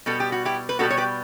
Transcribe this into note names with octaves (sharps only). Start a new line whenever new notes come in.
B2 G3 B3 A4
G4
F#4
E4 G4
B4
B2 G3 B3 F#4 A4
C#5
G4 B4